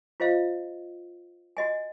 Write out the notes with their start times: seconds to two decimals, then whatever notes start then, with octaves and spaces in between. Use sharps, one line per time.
0.20 F4 C5 D#5 F5
1.57 F#4 D#5 G#5